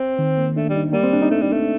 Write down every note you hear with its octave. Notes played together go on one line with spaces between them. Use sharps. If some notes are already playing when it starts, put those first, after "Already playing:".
Already playing: C4
D#3
A#3
A3 D4
G3
D#4
G3 A#3
C4
D4
D#4
A3
G3
A3